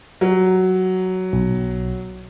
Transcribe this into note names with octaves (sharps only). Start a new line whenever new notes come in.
F#3
B1